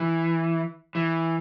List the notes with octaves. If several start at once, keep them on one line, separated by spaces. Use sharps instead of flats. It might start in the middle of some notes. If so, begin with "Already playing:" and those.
Already playing: E3
E3